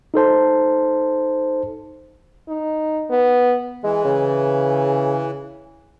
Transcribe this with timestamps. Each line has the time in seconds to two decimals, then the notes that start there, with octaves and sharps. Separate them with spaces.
0.14 D#4 A4 C5 A5
2.48 D#4
3.10 B3
3.84 E3 G#3
4.05 C#3